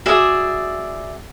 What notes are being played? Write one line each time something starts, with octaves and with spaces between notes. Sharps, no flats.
F#4 G#4 D5 E5